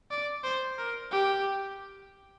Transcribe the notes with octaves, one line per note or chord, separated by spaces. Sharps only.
D5
C5
A#4
G4